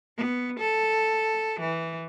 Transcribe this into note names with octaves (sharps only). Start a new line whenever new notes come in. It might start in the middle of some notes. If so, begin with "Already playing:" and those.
B3
A4
E3